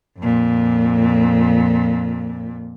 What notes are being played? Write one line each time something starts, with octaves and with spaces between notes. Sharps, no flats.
F2 A#2